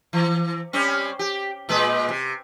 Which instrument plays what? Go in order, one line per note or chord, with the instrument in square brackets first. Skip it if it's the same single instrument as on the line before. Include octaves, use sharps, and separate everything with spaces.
[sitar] E3
G3 C4 C#4
G4
A#2 G#3 B4
C3